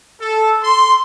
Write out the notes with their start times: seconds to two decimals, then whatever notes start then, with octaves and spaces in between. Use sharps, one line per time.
0.20 A4
0.62 C6